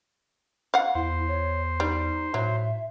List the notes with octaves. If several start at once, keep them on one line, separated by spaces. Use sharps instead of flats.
F5 F#5
E2 E4 C5
C#5
G3 D#4
A2 F#3 E5